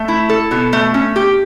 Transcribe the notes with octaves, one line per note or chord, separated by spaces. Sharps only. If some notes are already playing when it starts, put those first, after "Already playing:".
Already playing: A3
E4
A4
B2
A3
C#4
G4